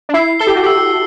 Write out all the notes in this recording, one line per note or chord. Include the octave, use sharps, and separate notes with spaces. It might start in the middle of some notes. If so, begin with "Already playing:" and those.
D4
E4 C7
A4 G7
G4
F#4
G4 E6